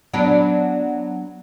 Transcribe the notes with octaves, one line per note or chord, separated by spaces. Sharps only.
F#3 B3 D4